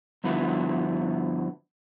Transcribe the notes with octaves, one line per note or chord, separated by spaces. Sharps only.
G2 D3 F3 B3 E4 F#4